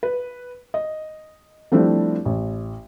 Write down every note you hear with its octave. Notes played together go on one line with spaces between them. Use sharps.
B4
D#5
F3 G3 A3 C4 D4 E4
A1